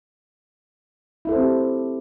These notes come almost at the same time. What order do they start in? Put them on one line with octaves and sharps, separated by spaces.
E4 A4 C5 C4 G4